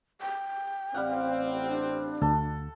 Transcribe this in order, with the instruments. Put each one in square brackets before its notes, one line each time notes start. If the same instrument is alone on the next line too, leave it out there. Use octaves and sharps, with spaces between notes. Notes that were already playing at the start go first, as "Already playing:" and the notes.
[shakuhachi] G5
[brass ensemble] A1 C4 [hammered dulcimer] G3 F5 F#5
[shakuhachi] D4
[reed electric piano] D2 [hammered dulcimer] A4